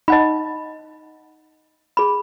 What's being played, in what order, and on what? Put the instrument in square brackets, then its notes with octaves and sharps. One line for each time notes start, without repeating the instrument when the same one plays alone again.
[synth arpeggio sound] D#4 F#5 A5 [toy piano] D#5 B5
[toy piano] G#4 B5